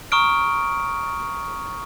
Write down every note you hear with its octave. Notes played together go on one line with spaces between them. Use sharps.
A#5 C#6 D#6 F6 D7